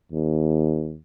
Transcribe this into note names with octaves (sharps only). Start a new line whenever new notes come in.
D#2